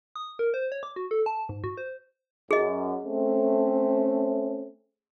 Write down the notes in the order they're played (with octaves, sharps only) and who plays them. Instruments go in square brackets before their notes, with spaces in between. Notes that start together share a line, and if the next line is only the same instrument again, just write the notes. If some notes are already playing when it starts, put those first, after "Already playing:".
[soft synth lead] D#6
A#4
C5
C#5
D6
F#4
A4
A5
G#2
F#4
C5
[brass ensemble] F#2 [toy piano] G#4 D#5
[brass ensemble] A3 C4 C#4